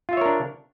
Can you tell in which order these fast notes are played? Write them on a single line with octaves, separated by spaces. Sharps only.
F4 E5 C#5 A#4 D4